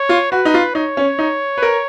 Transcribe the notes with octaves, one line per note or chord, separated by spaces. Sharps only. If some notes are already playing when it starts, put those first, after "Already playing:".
Already playing: C#5
F4
F#4 B4
D#4
F4
D#4 C#5
C#4
D#4
B4
A#4